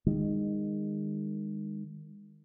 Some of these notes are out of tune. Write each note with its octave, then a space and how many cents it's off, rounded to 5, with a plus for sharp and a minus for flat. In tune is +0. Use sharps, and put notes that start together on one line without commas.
D#3 -15 G#3 -30